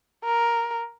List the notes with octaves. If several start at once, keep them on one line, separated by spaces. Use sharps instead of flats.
A#4